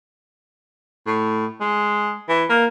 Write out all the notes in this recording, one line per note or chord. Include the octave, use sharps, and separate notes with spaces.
A2
G#3
E3
A#3